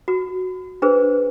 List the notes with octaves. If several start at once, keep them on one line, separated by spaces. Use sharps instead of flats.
F#4
D4 G#4 B4 C5